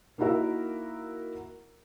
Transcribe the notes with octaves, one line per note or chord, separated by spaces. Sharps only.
A#3 D#4 E4 F#4 A#4 E5